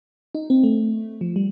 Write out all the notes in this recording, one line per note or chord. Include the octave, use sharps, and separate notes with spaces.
D#4
C4
A3
F3
G3